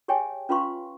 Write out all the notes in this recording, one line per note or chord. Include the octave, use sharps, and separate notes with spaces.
G4 G#4 C#5 E5 G5 G#5
C#4 F4 B4 F5 C6 C#6